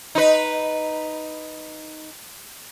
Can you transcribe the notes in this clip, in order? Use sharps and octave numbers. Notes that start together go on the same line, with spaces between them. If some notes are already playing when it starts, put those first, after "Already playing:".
D#4 B4